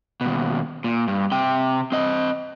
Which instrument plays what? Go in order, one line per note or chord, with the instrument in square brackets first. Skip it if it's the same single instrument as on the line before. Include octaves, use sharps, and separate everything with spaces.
[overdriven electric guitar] D#2 B2
A#2
G2
C3 G5
C4 D#5